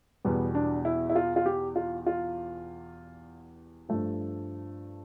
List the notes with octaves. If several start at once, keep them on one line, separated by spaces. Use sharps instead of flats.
E2 B2 G3 B3
D4
E4
E4
F4
F4
G4
F4
F4
G2 F3 A3